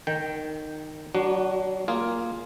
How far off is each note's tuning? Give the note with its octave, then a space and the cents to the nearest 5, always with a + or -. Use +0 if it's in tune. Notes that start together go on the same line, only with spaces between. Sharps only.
D#3 -15 G5 +0
F#3 +30 D4 +10 F#4 +0
A#3 +0 F4 +0 G#4 +0